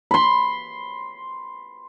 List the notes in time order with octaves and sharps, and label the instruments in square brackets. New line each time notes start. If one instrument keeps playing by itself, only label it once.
[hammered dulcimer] B5 C6